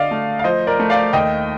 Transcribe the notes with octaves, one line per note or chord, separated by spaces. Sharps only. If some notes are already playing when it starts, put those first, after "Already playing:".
Already playing: D3 D5 D#5 F5
A3
F5
F3 C5 D#5
A#4 D5
A3
D5 F5
D#2 D#5 G5